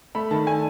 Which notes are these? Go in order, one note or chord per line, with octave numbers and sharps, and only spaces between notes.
A3 B5
D#3 A5
A3 G#5